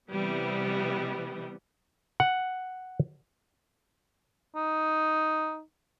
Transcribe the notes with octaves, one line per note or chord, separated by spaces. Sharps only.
C3 E3 G3 B3
F#5
D#4